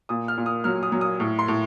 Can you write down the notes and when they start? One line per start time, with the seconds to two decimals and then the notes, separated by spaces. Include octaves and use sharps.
0.09 A#2 D#6
0.28 F6
0.38 A#2
0.46 D#6
0.64 F#3 F6
0.83 D#6
0.92 F#3
1.01 D#6
1.20 A2
1.39 C6
1.48 A2